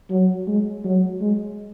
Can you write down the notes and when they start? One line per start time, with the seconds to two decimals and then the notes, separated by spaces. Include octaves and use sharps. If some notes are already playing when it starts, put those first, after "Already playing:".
0.10 F#3
0.48 G#3
0.84 F#3
1.21 G#3